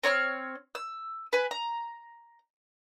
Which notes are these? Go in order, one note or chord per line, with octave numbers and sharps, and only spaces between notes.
C4 C#5 A#5 F6
E6
B4 G#5
A#5